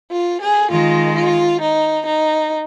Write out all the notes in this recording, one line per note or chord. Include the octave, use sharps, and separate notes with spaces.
F4
G#4
D#3 G#3 F4
F4
D#4
D#4